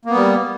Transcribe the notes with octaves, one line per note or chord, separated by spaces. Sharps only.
G3 A#3 B3